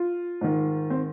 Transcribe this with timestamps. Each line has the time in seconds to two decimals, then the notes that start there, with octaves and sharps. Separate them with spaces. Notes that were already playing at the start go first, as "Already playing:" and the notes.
Already playing: F4
0.41 G#2 D#3
0.90 C4